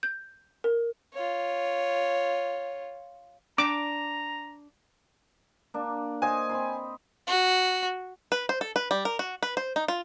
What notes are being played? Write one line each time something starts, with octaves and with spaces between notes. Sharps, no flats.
G6
A#4
F4 C#5
D4 A#5 D6
A#3 D4
C5 D#5 G#5
C4 B5 C6
F#4
B4
C5
A4
B4
G3
A#4
F#4
B4
C5
D#4
F4